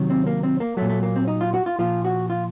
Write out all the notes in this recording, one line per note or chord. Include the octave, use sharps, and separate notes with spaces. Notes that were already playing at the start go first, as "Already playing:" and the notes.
Already playing: C3 D#3 F#3
C4
A#3
C4
A#3
A#2 F#3 A3
A3
A#3
C4
D#4
F4
F#4
F4
A#2 F3 F4
F#4
F4